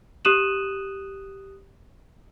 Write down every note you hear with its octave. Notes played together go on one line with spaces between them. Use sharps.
G4 D#6 F#6 D#7 E7 F#7